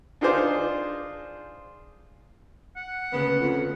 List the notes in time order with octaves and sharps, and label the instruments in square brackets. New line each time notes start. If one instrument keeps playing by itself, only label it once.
[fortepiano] D4 D#4 F4 G#4 C5 D6
[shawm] F#5
[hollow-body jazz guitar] D2 C#3 A#3 [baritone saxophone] B3
[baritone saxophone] F2